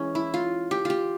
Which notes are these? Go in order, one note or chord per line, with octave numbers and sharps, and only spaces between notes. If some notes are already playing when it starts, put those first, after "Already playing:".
Already playing: E3 G#3 C#4
E4
F4
G4
F4 G4